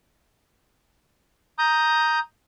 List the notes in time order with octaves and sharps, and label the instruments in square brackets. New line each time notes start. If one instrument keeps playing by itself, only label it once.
[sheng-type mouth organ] A#5 D#6 G6